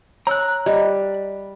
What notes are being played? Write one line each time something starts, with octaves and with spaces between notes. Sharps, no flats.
C#5 G#5 A#5 E6 F#6
G3 D5 D#5